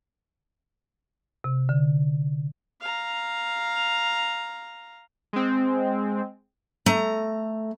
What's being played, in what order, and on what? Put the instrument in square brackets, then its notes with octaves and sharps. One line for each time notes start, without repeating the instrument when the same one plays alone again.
[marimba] C3
D3
[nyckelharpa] F5 A#5
[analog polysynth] G#3 C4
[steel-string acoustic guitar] A3 A#5